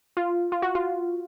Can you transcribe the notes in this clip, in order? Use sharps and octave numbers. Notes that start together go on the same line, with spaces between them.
F4
F4
F#4
F4